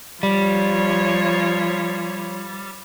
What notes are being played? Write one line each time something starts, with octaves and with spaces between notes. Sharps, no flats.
F3 G3 C#5